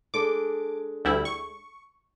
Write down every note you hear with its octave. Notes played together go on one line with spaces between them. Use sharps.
G#3 D4 A4 D6
D2 G3 E4
C#6